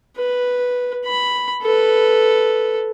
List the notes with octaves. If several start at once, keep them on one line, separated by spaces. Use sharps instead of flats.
B4
B5
A4 B4